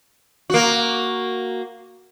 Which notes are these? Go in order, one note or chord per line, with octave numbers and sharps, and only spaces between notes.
A#3 F#4